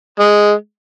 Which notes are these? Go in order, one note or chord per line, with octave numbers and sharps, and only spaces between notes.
G#3